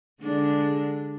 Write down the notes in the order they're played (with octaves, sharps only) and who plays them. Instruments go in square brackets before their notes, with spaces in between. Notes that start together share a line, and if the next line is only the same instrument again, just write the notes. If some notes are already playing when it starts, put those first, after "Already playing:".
[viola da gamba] D3 G#3 D4